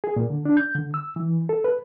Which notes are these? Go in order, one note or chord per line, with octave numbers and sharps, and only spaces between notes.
G#4
A#2
D3
D4
G6
D3
E6
E3
A4
B4